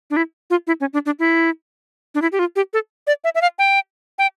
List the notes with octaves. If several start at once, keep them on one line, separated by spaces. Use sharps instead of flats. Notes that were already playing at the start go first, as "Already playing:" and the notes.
D4
E4
F4
E4
C#4
D4
D4
E4
D4
E4
G4
F4
G4
A4
D5
E5
E5
F5
G5
G5